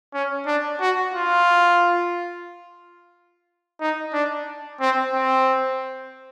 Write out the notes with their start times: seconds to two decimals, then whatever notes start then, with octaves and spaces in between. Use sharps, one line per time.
0.13 C#4
0.47 D4
0.81 F#4
1.14 F4
3.81 D#4
4.13 D4
4.81 C4
5.13 C4